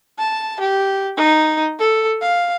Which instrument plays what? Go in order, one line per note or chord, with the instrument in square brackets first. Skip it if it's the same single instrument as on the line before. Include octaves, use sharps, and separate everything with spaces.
[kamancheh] A5
G4
D#4
A4
F5